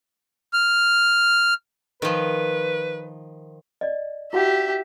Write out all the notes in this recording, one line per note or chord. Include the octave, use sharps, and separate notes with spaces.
F6
D#3 F3 B4
D5 D#5
E4 F#4 G4 E5 F#5